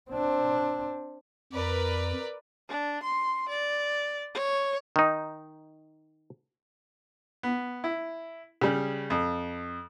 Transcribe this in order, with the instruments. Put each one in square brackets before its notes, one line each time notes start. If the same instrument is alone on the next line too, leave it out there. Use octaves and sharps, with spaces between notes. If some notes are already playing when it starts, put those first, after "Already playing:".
[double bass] C4 D4
[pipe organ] F2 [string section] A#4 B4 D5
[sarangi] D4
C6
D5
C#5
[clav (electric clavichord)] D#3 D#4
[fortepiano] B3
E4
C#3 G3
F2